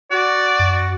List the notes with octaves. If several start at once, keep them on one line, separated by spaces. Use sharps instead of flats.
F#4 D5
F#2